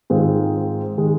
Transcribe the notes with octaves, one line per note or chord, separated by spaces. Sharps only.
G#2 D#3 G#3 C4 F4
D#3 G#3